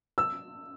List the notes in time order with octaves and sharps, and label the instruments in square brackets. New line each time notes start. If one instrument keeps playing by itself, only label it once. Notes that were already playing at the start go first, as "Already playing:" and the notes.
[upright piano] E6